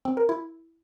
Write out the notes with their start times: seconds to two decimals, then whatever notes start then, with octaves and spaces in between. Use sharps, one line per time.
0.05 C4
0.17 A#4
0.29 E4